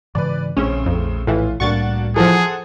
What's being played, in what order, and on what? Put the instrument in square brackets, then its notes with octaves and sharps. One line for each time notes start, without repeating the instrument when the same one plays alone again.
[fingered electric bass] G#2 C#3 E3 [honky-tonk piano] B4 D5
[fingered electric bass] A#1 [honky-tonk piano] A2 C#3 C4 [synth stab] C#4
[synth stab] F2
[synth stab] A2 E3 [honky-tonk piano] F4
[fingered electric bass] C2 A2 G3 [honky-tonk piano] A#3 D4 F#4 [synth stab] C#6 A6
[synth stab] E3 F3 [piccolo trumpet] G#4 [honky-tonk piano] A4 C5 F#5